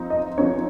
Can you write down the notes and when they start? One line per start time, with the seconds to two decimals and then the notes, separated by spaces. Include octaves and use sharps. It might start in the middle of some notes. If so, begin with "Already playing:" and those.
Already playing: F3 C4 D#4
0.10 D#5
0.38 F3 C4 D#4 C#5